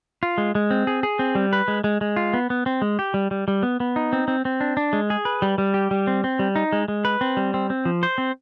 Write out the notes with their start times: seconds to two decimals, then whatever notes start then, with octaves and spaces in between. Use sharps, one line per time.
0.23 F4
0.38 G#3
0.55 G#3
0.71 C4
0.87 G#4
1.03 G#4
1.19 C4
1.35 G3
1.53 B4
1.68 G#3
1.84 G#3
2.01 G#3
2.16 F4
2.34 B3
2.50 B3
2.66 C4
2.82 G#3
2.99 G4
3.14 G3
3.31 G3
3.48 G3
3.63 B3
3.80 B3
3.96 D#4
4.13 C4
4.28 C4
4.45 C4
4.61 D4
4.77 D4
4.93 G#3
5.10 G#4
5.25 B4
5.42 G3
5.58 G3
5.74 G4
5.91 G3
6.07 C4
6.24 C4
6.39 G3
6.56 D#4
6.73 G#3
6.88 G#3
7.05 B4
7.21 C4
7.37 G3
7.54 C4
7.70 C4
7.85 F3
8.03 C5
8.18 C4